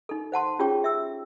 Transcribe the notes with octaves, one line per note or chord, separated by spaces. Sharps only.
D#4 A4
C5 F#5 A5 C6
C#4 F4 G4 G#4 C#5 G5
E5 E6